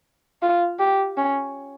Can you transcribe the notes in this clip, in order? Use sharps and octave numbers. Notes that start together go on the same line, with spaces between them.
F4
G4
C#4